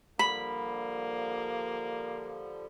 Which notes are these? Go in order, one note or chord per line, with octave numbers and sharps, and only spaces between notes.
D3 F3 G3 A#3 B5